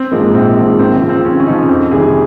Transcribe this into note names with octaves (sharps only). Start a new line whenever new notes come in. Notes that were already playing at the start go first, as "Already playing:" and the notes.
Already playing: C4
G#2 F3 G#3 A#3
A#1 C4
G#2 F3 G#3
D#2 C4
C4
C#3 F3
C4
D#2 C#4
C#4
C#3 F3 D#4
F2 C4
C3 D#3 G3 G#4